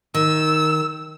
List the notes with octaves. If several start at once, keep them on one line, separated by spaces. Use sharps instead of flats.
D#3 E6